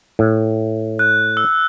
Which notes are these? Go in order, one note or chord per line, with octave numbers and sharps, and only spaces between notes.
A2
F#6
E6